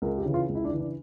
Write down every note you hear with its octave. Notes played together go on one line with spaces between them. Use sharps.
C#2 A#4
G4
C#3 E3
F4
C#2
E4
D4
C#3 E3
D4